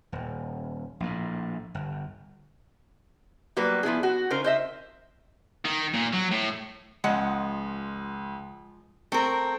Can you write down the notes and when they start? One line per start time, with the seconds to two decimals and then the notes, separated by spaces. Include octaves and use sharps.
0.12 D#1
1.00 A#1 A2
1.75 G1
3.57 F#3 G3 A#3 B4
3.83 F3 B3 E4 G#4
4.03 F#4
4.30 C#3 D#4 A#4 C5
4.44 C5 D#5 E5
5.65 D#3
5.94 A#2
6.13 F#3
6.32 A2
7.04 C#2 F3 G#3 F#5
9.12 A3 C4 A#4